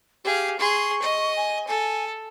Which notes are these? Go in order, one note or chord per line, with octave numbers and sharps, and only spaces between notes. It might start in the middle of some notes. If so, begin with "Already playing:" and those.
G4 G#4 F5
G#4 C6 C#6
D#5
G#5
A4 G#5